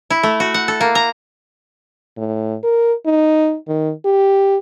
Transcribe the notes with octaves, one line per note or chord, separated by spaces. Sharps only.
E4
A3
F#4
F#5
A4
A#3
A#5
A2
A#4
D#4
D#3
G4